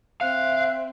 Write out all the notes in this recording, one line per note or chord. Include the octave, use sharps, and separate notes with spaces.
C4 E5 F5 F#6